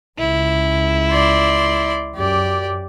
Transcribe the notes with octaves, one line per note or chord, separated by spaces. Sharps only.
C#2 E4
D5 C6
F#2 G4 D5